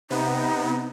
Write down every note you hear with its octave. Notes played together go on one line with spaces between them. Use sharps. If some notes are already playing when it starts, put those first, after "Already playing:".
C3 B3 D#4